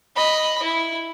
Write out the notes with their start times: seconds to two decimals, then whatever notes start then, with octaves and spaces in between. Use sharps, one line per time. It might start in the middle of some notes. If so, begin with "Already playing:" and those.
0.16 D#5 B5
0.63 E4